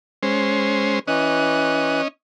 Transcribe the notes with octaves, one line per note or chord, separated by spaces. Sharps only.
G#3 C#4 C5
E3 C#4 D#5 F#6